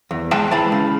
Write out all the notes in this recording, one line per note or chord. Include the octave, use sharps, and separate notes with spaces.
E2
G#3 G5 A5
E3 A5 B5
C#3